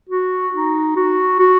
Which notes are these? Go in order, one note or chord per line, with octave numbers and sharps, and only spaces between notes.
F#4
D#4
F#4
F#4